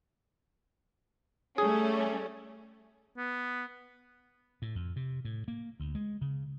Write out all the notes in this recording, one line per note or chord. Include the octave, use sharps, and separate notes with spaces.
G3 A3 C#4 G#4
B3
A2
F2
C3
A2
A#3
D2
G#3
C#3